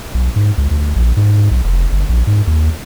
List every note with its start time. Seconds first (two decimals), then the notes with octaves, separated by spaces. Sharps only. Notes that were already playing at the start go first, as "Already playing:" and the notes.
0.14 B1
0.36 G#2
0.58 C#2
0.71 D2
0.96 A#1
1.17 G#2
1.51 B1
1.64 F1
1.92 G1
2.09 A#1
2.27 G#2
2.47 D#2